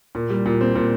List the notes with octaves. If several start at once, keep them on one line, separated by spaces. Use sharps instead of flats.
A#2
G3
A#2
C4
A#2